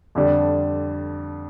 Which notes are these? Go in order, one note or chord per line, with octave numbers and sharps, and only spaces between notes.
F2 D3 G3 D4